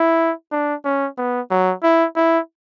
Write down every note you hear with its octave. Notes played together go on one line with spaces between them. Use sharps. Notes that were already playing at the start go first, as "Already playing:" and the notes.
Already playing: E4
D4
C#4
B3
F#3
E4
E4